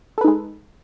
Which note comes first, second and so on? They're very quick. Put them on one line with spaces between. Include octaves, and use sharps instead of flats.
A4 B4 D#4 G#3